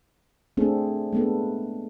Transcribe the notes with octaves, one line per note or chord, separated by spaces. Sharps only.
A3 C4 D4 G#4 A4
G#3 A3 B3 D4 A4